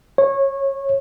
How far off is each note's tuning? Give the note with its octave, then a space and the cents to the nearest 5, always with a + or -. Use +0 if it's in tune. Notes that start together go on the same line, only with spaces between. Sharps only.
C#5 -20